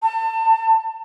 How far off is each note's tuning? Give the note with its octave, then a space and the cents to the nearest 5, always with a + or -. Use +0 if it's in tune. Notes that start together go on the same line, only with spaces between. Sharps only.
A5 +30